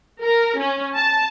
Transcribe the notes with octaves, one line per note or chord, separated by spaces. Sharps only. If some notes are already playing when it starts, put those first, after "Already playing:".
A#4
C#4
A5